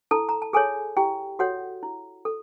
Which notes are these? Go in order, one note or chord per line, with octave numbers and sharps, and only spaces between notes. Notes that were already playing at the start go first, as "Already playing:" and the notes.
E4 A4 A5
A#5
A5
G#4 A4 C#5 G#5
E4 G4 G5
F#4 A4 C#5 F#5
E4
A4